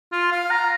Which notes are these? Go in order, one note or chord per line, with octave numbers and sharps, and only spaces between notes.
F4
F5
A#5